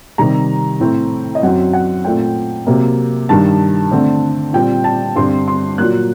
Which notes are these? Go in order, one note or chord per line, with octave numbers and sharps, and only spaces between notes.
C3 D#3 G3 A#5
A2 A3 C4
D#5
F#2 F#3 C4 F#5
F#5
A#2 A3 C4 G5
C3 F#3 A#3
G2 D#3 G3 A5
D3 A3 C4
A#2 G3 C4 G5
A5
G2 D3 G3 C4 C6
C6
A#2 F#3 A#3 F#6